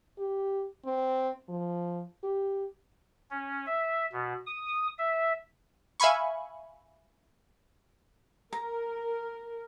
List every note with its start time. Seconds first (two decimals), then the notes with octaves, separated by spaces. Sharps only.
0.19 G4
0.86 C4
1.49 F3
2.24 G4
3.31 C#4
3.66 E5
4.12 B2
4.46 D#6
4.98 E5
6.00 E5 F5 G#5 B5 C#6
8.53 A#4 A#5